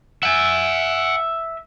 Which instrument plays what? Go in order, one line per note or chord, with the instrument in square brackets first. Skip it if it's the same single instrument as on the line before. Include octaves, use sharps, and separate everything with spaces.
[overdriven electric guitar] E5 [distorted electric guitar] F#5 G#5